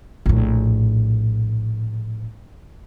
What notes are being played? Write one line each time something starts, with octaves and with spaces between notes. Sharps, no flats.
A#1 A2